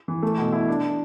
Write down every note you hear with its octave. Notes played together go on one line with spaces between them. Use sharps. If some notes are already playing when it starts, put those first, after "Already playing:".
E3
A3
B2
E4
D4